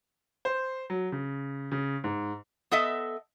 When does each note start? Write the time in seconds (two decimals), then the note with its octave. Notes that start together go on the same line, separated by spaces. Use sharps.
0.45 C5
0.90 F#3
1.12 C#3
1.72 C#3
2.04 G#2
2.71 B3 A4 D#5 E5